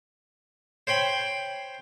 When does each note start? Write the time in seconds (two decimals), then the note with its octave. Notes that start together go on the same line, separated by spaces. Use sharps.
0.87 C5 C#5 G5 B5